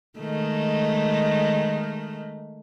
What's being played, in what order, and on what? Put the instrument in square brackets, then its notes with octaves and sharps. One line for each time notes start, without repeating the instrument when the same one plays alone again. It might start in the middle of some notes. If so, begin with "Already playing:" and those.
[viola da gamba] D#3 G#3 A3